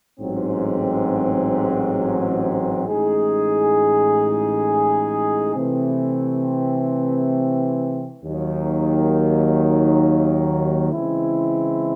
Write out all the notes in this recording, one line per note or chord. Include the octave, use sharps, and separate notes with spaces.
A1 G#2 F#3 C4
A1 A2 G#3 D#4 G#4
C3 E3 A3 C4
D#2 D#3 F#3
C#3 E3 G#3 C4 E4